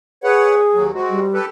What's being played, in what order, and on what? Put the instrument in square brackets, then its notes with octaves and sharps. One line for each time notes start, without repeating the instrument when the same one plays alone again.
[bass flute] G#4 [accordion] B4 C#5 F#5
[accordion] D#2 F#3
G#3 C4 F#4
[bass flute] G3
[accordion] G4 A4 B4